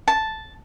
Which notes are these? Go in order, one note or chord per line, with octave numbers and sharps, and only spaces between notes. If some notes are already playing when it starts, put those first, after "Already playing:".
A5